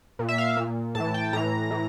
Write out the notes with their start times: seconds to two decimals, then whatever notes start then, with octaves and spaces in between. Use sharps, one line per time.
0.19 A#2
0.29 E5
0.38 F5
0.57 A#2
0.95 A2 E3 A5
1.14 G5
1.33 A2 E3 A#5
1.71 A2 E3